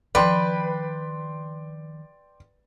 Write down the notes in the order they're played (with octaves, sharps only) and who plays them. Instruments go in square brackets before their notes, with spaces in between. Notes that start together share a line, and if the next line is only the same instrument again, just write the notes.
[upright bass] D#3 F3 [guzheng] B4 [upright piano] D5 G5 C6